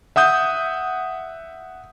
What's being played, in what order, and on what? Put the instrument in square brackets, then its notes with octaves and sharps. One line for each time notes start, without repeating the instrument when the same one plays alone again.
[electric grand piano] E5 F#5 D#6 G6